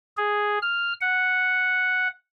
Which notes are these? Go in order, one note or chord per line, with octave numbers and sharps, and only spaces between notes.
G#4
F6
F#5